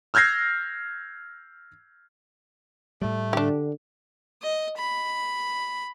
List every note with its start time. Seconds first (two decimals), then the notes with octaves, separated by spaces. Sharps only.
0.14 E6 F6 G6 G#6 A#6 C7
3.02 A2 G3 A3
3.33 D3 D4 G4
4.42 D#5
4.77 B5